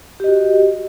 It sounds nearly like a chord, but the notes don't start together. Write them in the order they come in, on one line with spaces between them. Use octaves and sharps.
G4 D#5 F#4